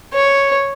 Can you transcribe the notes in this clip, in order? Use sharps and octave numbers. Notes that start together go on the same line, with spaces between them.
C#5